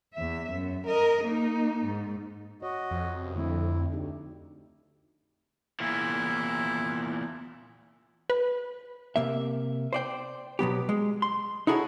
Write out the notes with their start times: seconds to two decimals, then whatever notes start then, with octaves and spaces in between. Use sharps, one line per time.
0.14 E2 E5
0.52 F#2
0.87 A#4 D#5
1.25 A#3 D#4
1.85 G#2
2.62 F#4 C#5 D#5
2.91 F2
3.20 F#2 C3
3.36 D3 A3 C4 E4
3.92 D2 D4 D#4 G4
5.80 E2 A#2 E4
8.30 B4
9.16 C3 A#3 E5
9.93 C5 D5 G5
10.59 B2 F#3 B3 G4
10.89 G#3
11.22 C6
11.67 D#4 E4 F#4 G#4 A4 C#5